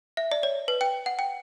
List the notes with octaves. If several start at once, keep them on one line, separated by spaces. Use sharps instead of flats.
E5
D5
C#5
B4
G5
F#5
G5